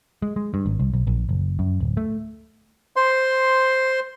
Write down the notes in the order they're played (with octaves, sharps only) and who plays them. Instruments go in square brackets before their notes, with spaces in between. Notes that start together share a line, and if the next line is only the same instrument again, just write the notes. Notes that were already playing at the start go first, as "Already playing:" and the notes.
[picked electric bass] G#3
G#3
G2
G#1
C2
B1
A#1
F#1
F#2
D1
A3
[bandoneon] C5 C6